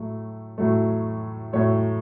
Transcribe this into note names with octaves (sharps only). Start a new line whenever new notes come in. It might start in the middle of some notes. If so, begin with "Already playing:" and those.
Already playing: A2 F#3 A3
A2 F#3 A3
A2 F#3 A3 C#5